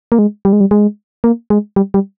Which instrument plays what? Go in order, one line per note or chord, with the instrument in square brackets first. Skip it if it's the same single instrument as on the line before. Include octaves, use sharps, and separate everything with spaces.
[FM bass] A#3
G#3
G3
G#3
G3
G#3
A#3
G#3
G3
G3